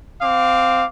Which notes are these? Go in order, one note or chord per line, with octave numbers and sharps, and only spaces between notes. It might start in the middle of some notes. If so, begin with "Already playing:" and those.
C4 F5 D6